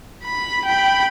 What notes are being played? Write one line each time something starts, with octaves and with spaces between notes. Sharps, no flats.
B5
G5 B5